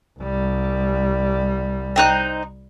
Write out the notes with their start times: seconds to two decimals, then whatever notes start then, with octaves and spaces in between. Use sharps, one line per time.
0.19 C2 G3
1.96 C4 D#4 F#6